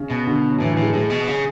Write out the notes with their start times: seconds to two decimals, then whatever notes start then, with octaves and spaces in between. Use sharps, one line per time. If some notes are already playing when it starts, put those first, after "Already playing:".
Already playing: C#3
0.10 B2
0.27 D3
0.50 F#3
0.60 A2 E3
0.71 E3
0.77 A2
0.82 G#3
0.93 A2 G#3
1.10 B2
1.27 C#3